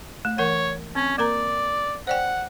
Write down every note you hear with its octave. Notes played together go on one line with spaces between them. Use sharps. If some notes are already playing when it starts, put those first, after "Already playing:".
A3
E3 A#4 C#5 F#5
C4 C#4
A#3 A#4 D5 A#5
C5 D5 F#5 G5